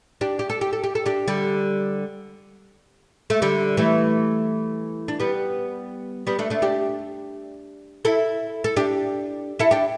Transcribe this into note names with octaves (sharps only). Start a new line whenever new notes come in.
D4 G4
G4
A4
G4
A4
G4
A4
D4 G4
D3 G3
A3
D3 G3
E3 A3
D4
G3 B3
G3 B3
A3 D4
A3 D4
D4 G4
E4 A4
A4
D4 G4
E4 A4
D4 G4